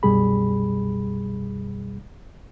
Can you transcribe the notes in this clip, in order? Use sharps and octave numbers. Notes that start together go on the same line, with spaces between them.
C2 F#2 B2 G3 G#4 B5